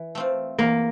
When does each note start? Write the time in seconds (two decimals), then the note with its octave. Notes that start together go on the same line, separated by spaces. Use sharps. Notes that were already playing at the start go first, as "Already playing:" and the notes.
Already playing: E3
0.15 A3 C4 F4
0.59 E2 A#3